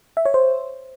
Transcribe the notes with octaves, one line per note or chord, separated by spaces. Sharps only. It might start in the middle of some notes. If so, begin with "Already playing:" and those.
E5
C#5
C5